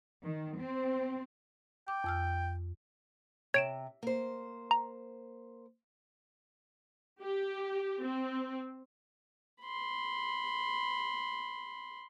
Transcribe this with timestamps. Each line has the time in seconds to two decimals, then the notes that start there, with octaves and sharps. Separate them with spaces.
0.23 D#3
0.57 C4
1.88 G5 D6
2.04 F2 E6 F6
3.54 C3 C#5 D7 E7
4.03 A#3 C5
4.71 A#5
7.21 G4
8.04 C4
9.62 B5 C6